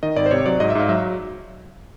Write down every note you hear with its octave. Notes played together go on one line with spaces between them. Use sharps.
D#3 D#5
G#1 D5
C5
C3 C#5
F#3 D5
G#2 D#5
E5
G#2 F5
F#3 E5